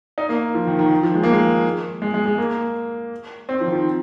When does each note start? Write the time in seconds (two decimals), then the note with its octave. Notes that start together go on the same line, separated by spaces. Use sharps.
0.18 D#4
0.29 A#3
0.54 F3
0.67 D#3
0.79 D#3
0.91 D#3
1.03 F3
1.15 G#3
1.23 A#3
1.32 G#3
2.02 G#3
2.14 G#3
2.26 G#3
2.38 A#3
3.49 C4
3.61 F3
3.66 D#3
3.72 F3